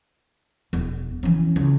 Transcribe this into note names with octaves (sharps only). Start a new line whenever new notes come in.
E1
E3 C#4
C#2